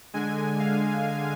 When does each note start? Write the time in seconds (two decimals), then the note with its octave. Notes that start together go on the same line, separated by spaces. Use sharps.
0.14 D3 G#3 G#5
0.59 F5